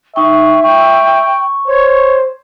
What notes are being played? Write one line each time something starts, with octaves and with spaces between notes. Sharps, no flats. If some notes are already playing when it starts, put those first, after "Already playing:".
D#4 E5 G5 C#6
G5 C#6
C5 C#5